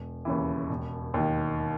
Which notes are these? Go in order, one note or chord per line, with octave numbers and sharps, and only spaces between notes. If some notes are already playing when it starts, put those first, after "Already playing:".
Already playing: E1
D#2 C#3 E3
E1
D#2 D#3